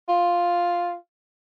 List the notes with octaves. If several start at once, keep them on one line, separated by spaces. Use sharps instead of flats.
F4